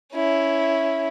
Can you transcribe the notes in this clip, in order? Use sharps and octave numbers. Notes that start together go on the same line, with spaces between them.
C#4 E4